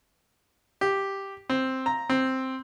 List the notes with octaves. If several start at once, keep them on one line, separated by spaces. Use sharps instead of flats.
G4
C4
A#5
C4